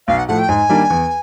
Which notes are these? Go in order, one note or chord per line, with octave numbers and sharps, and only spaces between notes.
B1 F5
F#5
A2 F3 A3 F#5
G5
G#2 G#5
D#3 G3 A#3 D4
E2